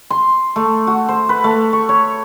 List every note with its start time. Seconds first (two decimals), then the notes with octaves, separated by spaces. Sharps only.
0.10 C6
0.56 A3
0.87 F#4
1.09 C5
1.29 B4
1.44 A3
1.73 C#6
1.89 C#5